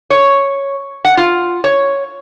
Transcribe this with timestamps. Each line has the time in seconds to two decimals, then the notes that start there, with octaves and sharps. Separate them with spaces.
0.10 C#5
1.05 F#5
1.17 F4
1.64 C#5